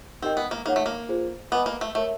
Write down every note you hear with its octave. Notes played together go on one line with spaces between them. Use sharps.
C4 D#4 G4 A#4 D#5 G5
B3
A#3
A#3 D#4 G#4 C#5 F#5
A3
A#3
F4 G#4 C5
B3 B4 D#5 G#5 B5 D6
A#3
A3
A3 A#4 C#5 E5